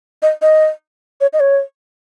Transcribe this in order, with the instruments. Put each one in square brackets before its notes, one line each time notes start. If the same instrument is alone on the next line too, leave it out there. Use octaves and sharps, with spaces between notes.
[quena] D#5
D#5
C#5
D#5
C#5